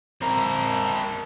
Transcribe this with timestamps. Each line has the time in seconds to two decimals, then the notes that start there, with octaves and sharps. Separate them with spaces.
0.22 C4 A#4